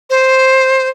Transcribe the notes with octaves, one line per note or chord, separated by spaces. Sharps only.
C5